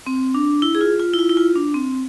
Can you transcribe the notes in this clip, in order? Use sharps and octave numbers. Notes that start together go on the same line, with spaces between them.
C4
D4
E4
G#4
F4
F4
E4
F4
E4
F4
D4
C4